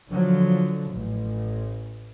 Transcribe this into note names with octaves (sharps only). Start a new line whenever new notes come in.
D3 F3 F#3
A1